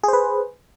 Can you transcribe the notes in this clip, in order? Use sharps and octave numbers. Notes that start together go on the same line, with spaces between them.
G#4 B4 C5